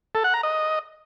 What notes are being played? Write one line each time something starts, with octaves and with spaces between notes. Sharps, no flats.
A4
F#5
A#5
D#5